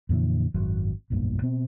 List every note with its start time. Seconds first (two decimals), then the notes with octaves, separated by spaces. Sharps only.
0.09 F2 A#2 D3 E3
0.54 G#1 F#2 F#3
1.10 F1 B1 G2 A#2
1.42 B2 C4